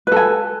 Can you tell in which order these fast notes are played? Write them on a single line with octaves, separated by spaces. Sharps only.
B4 A4 G#5